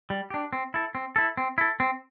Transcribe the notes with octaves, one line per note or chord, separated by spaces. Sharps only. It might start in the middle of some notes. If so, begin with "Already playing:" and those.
G3
D4 G4
C4
E4 A4
C4
E4 A4
C4
E4 A4
C4